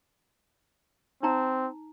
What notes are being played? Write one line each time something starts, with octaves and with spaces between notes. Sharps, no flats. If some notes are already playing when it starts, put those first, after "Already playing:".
C4 D#4 A#5